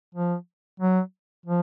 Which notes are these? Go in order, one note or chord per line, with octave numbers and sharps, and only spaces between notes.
F3
F#3
F3